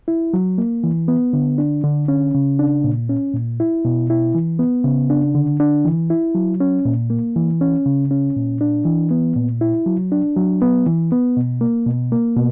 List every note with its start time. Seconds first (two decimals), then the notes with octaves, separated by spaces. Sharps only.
0.08 E4
0.34 F#3
0.58 A#3
0.84 E3
1.08 B3
1.33 D3
1.58 D4
1.84 D3
2.08 C#4
2.35 C#3
2.59 D4
2.84 A#2
3.09 C#4
3.34 A#2
3.60 E4
3.85 B2
4.10 E4
4.35 E3
4.59 B3
4.84 C#3
5.10 D4
5.35 D3
5.60 D4
5.85 E3
6.10 E4
6.35 F#3
6.60 C#4
6.85 A#2
7.10 A#3
7.36 E3
7.61 C#4
7.86 C#3
8.11 C#4
8.36 A#2
8.61 D4
8.85 E3
9.11 B3
9.36 A#2
9.61 E4
9.86 F#3
10.12 D4
10.37 F#3
10.62 B3
10.86 E3
11.12 B3
11.37 B2
11.61 A#3
11.86 B2
12.12 A#3
12.36 B2